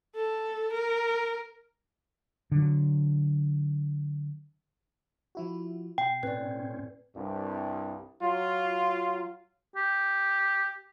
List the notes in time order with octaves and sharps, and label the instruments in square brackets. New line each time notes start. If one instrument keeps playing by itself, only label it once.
[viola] A4
A#4
[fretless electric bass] D3 F#3
[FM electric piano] F3 E4 F#4
[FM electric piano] B2 [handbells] G5
[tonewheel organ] A2 C4 C#4 [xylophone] B4 D5
[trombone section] C2 G2
F#3 F4
[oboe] G4